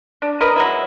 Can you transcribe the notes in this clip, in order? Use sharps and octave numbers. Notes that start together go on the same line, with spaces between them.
D4
A#4 B4 D#5
F#3 G#3 E4